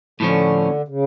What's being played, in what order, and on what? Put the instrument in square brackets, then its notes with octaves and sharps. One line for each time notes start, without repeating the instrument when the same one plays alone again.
[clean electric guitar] A2 F3 C#4 [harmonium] D3
[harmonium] C#3